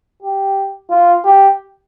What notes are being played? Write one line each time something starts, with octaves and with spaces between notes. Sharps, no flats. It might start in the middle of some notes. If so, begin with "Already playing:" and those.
G4
F4
G4